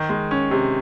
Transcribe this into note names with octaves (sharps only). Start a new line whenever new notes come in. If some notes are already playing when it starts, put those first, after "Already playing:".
Already playing: D#3
G#3
C#4
C3